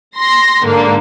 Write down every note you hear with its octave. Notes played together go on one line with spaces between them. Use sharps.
C6 A#6
G#2 D3 A#3